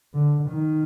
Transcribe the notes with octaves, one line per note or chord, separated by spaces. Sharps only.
D3
D#3